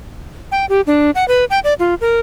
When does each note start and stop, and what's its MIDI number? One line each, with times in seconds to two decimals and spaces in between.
0.52 0.66 79
0.69 0.81 67
0.87 1.11 62
1.15 1.27 78
1.28 1.45 71
1.50 1.59 79
1.64 1.74 74
1.79 1.94 65
2.01 2.20 70